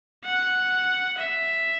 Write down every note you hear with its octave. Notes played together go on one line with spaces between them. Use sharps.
F#5
E5